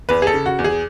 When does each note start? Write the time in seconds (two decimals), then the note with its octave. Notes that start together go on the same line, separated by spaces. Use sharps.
0.09 E2 B4
0.22 G#4
0.27 A4
0.34 C#3
0.46 F#4
0.59 E2
0.64 G#4